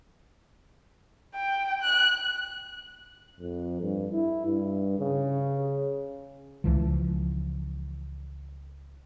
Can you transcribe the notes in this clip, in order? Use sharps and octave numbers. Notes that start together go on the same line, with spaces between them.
G5
F#6
F2
G2
E4
G2
C#3
C#2 E3 F3